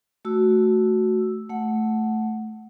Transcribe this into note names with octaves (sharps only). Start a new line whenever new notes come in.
A3 F#4 E6
A3 F#5